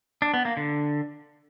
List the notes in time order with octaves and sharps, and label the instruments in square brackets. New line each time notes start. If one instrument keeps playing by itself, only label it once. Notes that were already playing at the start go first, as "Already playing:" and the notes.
[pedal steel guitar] D4
B3
A#3
D3